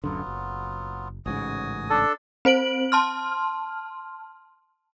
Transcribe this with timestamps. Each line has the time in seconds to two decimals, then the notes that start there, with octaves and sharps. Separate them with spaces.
0.04 D1 F#2 D3 F#3 B3 F4
0.27 F#1
1.26 A1 G#2 C#3 F#4 G#5 D#6
1.90 D4 A4
2.45 C4 C5 D7 F#7
2.92 A5 C6 F6